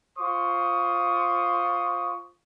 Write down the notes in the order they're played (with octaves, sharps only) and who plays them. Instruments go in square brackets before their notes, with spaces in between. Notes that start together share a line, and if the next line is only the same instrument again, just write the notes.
[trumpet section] F4 C5 C6 C#6 D#6